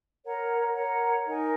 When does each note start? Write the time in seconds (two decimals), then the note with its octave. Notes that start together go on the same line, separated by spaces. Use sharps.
0.24 A#4 C#5 F#5 A#5
0.74 A#4 C#5 F#5 A#5
1.26 D#4 A#4 D#5 G#5